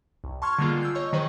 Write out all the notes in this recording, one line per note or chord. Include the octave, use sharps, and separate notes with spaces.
C2
A5 C6 C#6 F6 G#6
D3 G3 G#3 A#3 F4 G#4
E6 G6 C7
C#5 D#5 C#6 G6
D#3 F#3 G#4 B4 C5